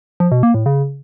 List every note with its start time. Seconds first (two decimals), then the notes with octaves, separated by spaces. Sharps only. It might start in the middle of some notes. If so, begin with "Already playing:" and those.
0.20 F3
0.32 B2
0.43 A#3
0.54 A2
0.66 C#3